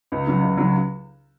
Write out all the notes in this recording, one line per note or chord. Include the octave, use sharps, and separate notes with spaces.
C#2
C#3 F#3
C#2
C#3 F#3